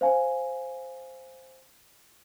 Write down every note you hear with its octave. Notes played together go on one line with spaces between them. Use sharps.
C5 F5 G#5